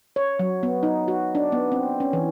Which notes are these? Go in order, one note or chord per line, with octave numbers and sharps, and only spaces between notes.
C#5
F#3
B3
D#4
F#4
D4
B3
C4
C#4
E3